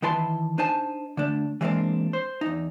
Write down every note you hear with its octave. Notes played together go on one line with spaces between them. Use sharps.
D#3 E3 E4 B4 A5 C6
D4 D#4 C5 G#5 A5
D3 A3 D4
E3 G3 G#3 A#3 C4 D4
C5
E2 D#4